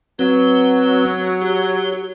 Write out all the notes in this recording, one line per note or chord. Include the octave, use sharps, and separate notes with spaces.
F#3 C4 B4
G4